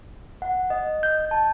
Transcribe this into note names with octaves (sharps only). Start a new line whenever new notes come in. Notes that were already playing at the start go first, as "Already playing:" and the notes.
F#5
D#5
G6
A5